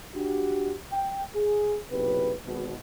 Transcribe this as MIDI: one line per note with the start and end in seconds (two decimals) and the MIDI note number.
0.15 0.74 62
0.15 0.74 66
0.15 0.74 67
0.92 1.23 79
1.34 1.79 68
1.90 2.33 30
1.90 2.33 35
1.90 2.33 48
1.90 2.33 67
1.90 2.33 71
2.44 2.74 32
2.44 2.74 47